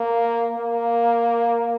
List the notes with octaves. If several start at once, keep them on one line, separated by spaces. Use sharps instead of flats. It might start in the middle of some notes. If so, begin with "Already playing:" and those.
Already playing: A#3
A#3